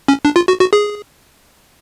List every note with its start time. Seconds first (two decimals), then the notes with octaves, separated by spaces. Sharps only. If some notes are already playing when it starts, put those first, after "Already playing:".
0.08 C#4
0.25 D4
0.36 F4
0.48 F#4
0.60 F#4
0.73 G#4